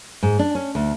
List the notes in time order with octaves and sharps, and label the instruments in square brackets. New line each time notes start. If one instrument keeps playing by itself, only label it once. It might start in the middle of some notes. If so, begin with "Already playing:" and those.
[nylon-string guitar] G#2
D4
C#4
D2